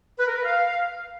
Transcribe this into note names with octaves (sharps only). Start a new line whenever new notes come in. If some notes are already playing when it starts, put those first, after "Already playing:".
B4
A#4
B4
F5